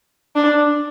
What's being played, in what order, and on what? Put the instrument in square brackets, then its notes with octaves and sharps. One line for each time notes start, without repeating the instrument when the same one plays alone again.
[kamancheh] D4